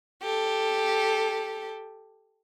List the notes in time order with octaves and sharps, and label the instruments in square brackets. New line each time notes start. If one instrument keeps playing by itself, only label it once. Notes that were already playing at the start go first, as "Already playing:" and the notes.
[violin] G4 A4